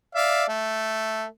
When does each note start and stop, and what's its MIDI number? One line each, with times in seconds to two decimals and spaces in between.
0.15 0.44 74
0.15 0.44 76
0.15 0.44 77
0.49 1.25 57